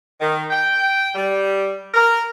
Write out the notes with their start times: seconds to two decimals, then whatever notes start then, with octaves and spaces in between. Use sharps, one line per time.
0.20 D#3
0.51 G5
1.16 G3
1.94 A#4